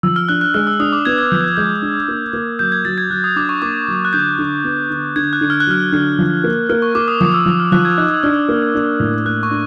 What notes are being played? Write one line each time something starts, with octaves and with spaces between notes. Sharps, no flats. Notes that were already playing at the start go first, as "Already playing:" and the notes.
F3 E6
F6
D4 F#6
F#6
G#3 F6
E6
D4 D#6
D6
B3 G#6
G#6
F3 G6
F#6
G#3 G6
D4
A#3
A#3
F#3 G6
G#6
F#3 A6
G#6
F#3 F#6
D#6
D4 D6
C#6
A#3 D6
F#3
F#6
D3 G6
D3
B3
D3
D3 G#6
F#6
D3
F6
F#6
F#3 F6
D3
F3
A#3
A#3 F6
C#6
A#3 D6
D#6
F3 D#6
E6
F3
F6
F3 F#6
G#6
D#4 F#6
E6
D4 F6
A#3
D4
A2
A#3 F#6
C#6
D4